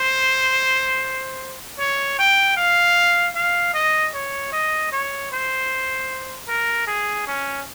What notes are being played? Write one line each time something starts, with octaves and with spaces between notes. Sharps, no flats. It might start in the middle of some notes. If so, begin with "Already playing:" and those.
Already playing: C5
C#5
G5
F5
F5
D#5
C#5
D#5
C#5
C5
A#4
G#4
C#4